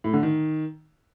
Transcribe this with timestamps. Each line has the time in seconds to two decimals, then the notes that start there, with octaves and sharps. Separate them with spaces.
0.04 A2
0.14 D3
0.23 D#3